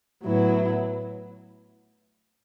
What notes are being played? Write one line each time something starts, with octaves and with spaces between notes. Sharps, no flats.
A2 F#3 B3 E4